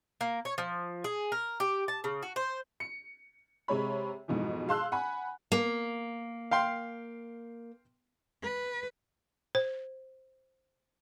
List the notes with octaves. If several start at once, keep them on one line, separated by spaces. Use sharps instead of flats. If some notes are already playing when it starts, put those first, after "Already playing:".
A#3
C#5
F3
G#4
A#4
G4
A5
C#3
F#4
C5
C#7
C3 G#3 C#5 B5
F2 G#2 B2 E3
G#4 F5 A5 C6 E6 F#6
F#5 G#5 B5
A#3
F5 G5 C6
B4
C5